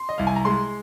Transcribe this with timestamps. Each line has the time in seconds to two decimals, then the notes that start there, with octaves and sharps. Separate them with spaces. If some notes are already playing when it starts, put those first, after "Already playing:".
Already playing: C6
0.09 D#5
0.18 C2 F5
0.27 G#5
0.36 A#5
0.45 G#3 C6